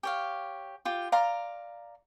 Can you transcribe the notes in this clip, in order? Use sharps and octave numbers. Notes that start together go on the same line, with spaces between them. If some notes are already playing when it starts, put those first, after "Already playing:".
G4 C#5 F5
F4 G4
D5 F5 A#5 C6